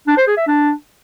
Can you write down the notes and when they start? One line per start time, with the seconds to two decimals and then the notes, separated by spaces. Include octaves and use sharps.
0.07 D4
0.17 C5
0.27 G#4
0.37 E5
0.47 D4